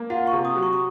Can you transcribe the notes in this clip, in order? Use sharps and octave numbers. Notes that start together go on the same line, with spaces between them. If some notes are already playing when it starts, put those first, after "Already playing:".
Already playing: A#3
F4 F#5
C#6
C3
D#6
F#3
C#6
C#6